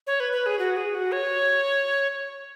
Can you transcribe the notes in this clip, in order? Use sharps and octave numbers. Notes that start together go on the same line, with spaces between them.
C#5
B4
B4
G#4
F#4
G#4
F#4
C#5